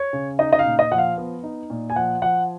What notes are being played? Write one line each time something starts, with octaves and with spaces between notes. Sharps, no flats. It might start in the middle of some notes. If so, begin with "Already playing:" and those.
Already playing: C#5
C#3
D#4 D#5
D#5
F5
A#2
D#5
F3 F#5
F5
B3
D#4
A#2
G#5
F3 F#5
F3 F#5